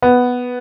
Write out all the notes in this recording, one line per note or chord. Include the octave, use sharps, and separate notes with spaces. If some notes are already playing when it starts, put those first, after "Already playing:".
B3